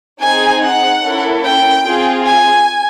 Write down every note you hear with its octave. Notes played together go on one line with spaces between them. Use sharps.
C4 D#4 G#4 G#5
F#5
A#3 C#4 E4 A4
G5
C4 F4 G#4
G#5